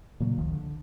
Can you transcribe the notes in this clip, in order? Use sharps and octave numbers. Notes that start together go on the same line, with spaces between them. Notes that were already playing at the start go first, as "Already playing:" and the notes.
A#2 C#3 F#3 A#3
F1 C#2 D#3 F3
D3